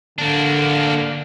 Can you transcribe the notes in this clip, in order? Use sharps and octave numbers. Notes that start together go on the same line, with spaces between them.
D3 A#3 D4